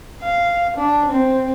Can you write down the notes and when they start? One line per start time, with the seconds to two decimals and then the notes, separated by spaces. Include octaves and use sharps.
0.21 F5
0.75 D4
1.10 C4